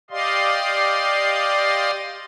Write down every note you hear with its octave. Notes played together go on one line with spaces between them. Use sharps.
G4 D5 D#5 F5 C6